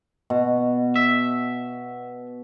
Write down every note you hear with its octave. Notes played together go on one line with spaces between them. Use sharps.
B2
E5